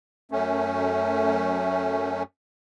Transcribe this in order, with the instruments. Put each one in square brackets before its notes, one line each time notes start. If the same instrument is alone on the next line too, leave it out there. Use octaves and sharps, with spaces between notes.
[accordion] F#2 A3 C#4